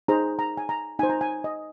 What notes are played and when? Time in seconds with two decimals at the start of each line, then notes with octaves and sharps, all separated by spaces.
0.08 D#4 G#4 C5 A#5
0.39 A#5
0.57 G#5
0.69 A#5
0.99 D#4 C5 G#5
1.10 A#5
1.21 G#5
1.44 D#5